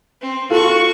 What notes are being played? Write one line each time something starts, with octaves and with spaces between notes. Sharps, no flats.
C4
F4 F#4 A4 C#6